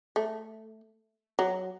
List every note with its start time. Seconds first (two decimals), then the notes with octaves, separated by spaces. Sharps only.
0.16 A3
1.39 F#3